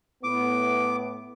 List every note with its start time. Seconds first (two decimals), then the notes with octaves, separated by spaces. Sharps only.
0.24 A2 B3 D6